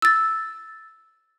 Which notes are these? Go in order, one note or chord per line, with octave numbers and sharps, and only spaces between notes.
E6 A6